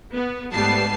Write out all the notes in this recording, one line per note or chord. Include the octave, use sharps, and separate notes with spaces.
B3
G#2 G3 A3 B3 A5 C7